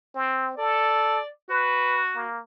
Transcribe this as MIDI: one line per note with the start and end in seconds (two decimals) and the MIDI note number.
0.15 0.55 60
0.58 1.19 69
0.58 1.28 74
1.50 2.26 66
1.50 2.01 71
2.16 2.40 58